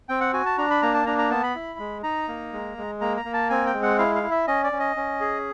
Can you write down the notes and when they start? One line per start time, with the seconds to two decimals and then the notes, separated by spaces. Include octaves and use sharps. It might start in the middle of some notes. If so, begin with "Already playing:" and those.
0.09 C4 G5
0.21 F#5
0.33 F#4 G#5
0.46 A5
0.58 D4 A#5
0.70 B5
0.82 A#3 A#5
0.94 A5
1.06 D4 A#5
1.18 A#5
1.30 B3 A5
1.43 B5
1.55 E4
1.79 G#3
2.03 D#4 A#5
2.28 A#3
2.53 G#3
2.78 G#3
3.01 A#3 A#5
3.17 A#5
3.25 A#3
3.33 A5
3.50 C4 G#5
3.66 G5
3.74 G#3
3.83 F#5
3.98 E4 F5
4.15 F5
4.23 E4
4.31 E5
4.47 C#4 D#5
4.64 D5
4.72 C#4
4.80 D#5
4.96 C#4
5.21 G#4